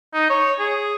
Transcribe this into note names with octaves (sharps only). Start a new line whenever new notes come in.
D#4
C#5
G#4